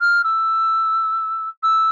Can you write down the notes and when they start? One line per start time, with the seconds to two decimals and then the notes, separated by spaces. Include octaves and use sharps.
0.01 F6
0.24 E6
1.63 E6